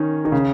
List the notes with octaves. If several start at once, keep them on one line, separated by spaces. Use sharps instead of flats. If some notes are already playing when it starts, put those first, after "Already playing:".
Already playing: D#3 C#4 D#4
D#3
C#3